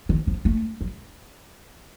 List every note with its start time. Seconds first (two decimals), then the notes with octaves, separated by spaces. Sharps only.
0.09 D#3
0.27 F3
0.45 A3
0.81 F#3